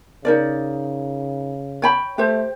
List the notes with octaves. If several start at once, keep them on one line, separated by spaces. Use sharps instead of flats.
C#3 D#4 A#4 D5
C#5 G5 B5
A3 G4 C5